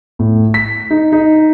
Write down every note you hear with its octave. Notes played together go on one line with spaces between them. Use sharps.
A2
B6
D#4
D#4